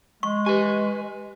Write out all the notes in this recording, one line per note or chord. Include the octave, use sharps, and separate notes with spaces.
G#3 C#6
G4 B4 G#5